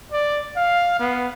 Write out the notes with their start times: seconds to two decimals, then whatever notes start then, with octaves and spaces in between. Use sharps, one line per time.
0.12 D5
0.56 F5
1.00 B3